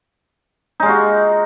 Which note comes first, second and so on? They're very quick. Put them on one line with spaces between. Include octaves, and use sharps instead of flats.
D#4 G#3 F4 F#4